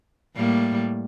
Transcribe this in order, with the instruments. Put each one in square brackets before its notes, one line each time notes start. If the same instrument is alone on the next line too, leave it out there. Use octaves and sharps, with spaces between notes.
[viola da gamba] A2 G3 A#3